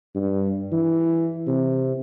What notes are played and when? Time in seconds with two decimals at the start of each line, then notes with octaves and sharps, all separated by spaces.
0.15 G2
0.72 E3
1.47 C3